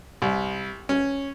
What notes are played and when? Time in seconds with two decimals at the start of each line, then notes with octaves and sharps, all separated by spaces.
0.22 C2
0.89 C#4